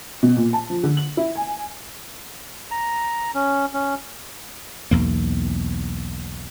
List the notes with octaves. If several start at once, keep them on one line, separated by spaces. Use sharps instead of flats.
B2
A#2
A5
F3
D3
F#7
E4
G#5
A#5
C#4
C#4
B1 E2 A#3